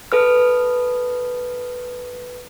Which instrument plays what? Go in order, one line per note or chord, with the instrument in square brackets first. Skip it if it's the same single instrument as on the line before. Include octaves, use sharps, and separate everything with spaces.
[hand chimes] A4 B4 F6